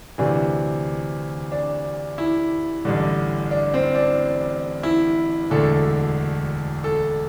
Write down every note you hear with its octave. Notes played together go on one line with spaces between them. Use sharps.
D2 C3 E3 D4
D4
E4
A1 G2 D3
D4
C4
D4
E4
E1 D2 D3 A4
A4